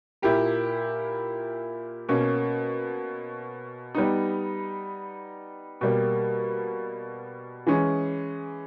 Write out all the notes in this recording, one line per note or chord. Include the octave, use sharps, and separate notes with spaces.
A#2 A#3 E4 G4 A#4
B2 A#3 C#4
G3 B3 D#4
B2 G3 A#3
E3 G#3 C#4 G#4